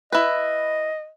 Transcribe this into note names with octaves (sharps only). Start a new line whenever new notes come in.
E4 B4 D#5